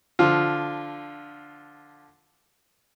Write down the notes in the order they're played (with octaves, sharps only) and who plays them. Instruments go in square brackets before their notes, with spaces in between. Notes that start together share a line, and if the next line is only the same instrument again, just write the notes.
[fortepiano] D3 F3 F4